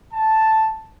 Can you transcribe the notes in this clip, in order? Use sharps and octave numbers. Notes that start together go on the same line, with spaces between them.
A5